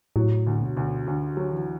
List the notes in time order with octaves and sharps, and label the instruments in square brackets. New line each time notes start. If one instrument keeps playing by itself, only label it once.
[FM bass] A2 [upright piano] F#3
[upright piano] D2
[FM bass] B2
[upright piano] D2
[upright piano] D2 [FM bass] D3
[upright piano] F#3
[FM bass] E3